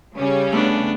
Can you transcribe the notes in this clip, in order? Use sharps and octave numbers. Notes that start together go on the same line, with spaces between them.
C#3 G3 C#4
A3 B3 D4 D6